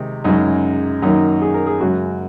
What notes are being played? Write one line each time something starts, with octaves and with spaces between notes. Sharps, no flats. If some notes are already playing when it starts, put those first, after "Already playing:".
Already playing: C3 D#3 G#3 D#4
F#2 C#3 G#3 D#4
F#2 D#3 F#3 A#3 D#4
G#4
A#4
G#4
F#2 C#3 G#3 F#4